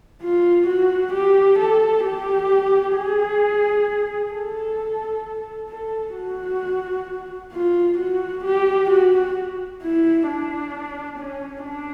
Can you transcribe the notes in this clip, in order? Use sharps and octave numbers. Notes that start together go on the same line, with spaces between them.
F4
F#4
G4
A4
G4
G#4
A4
A4
F#4
F4
F#4
G4
F#4
E4
D4
C#4
D4